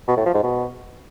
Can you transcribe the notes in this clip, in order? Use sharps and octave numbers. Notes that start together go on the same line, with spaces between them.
B2
A2
F3
G#2
B2